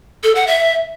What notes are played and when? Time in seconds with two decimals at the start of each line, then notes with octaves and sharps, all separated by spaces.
0.24 A4
0.35 F#5
0.47 E5